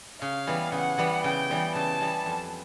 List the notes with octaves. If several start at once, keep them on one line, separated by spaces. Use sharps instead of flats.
C#3 F5
E3 G3 B3
C#3 F#5
E3 G3 B3
C#3 G5
E3 G3 B3
C#3 A5
E3 G3 B3
F2